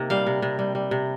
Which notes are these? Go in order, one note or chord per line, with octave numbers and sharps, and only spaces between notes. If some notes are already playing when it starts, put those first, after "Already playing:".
Already playing: C3 A#3 D#4
G3 F5
C3
C3
G3
G3
C3